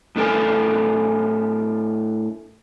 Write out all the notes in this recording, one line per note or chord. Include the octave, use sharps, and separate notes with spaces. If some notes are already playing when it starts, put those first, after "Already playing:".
A2 D4 A4 A#4 G#5